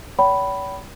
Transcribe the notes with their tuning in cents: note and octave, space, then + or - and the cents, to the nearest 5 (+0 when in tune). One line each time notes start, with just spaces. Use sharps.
C#5 +45 G5 -40 B5 +0